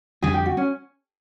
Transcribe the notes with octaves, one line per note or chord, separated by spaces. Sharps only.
F2 D3 G3 G#4
G4
F#4
C#4